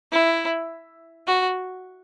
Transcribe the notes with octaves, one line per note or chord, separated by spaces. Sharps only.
E4
F#4